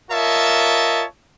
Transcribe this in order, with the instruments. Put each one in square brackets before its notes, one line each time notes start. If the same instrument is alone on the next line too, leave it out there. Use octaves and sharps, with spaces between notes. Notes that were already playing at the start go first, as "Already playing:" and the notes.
[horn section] F4 A#4 C#5 D#5 E5 A5